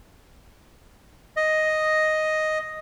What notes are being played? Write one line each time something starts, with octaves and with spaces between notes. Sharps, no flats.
D#5